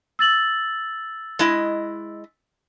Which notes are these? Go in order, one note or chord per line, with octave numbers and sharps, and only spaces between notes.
E6 A6 F#7
G#3 E4 D#5